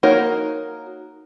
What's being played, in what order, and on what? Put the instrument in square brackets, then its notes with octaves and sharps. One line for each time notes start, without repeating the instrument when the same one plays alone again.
[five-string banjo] A#3 D#4 F#4 A#4 C#5